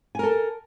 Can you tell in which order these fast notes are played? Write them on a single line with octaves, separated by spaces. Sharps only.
G#5 A#4 A4